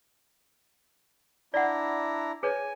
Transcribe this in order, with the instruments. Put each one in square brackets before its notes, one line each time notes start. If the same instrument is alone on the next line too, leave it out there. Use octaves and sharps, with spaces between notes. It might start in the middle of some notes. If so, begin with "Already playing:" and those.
[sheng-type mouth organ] D4 E4 A#5 [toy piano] D5 F#5
[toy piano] G#4 B4 C#5 [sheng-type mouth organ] G#5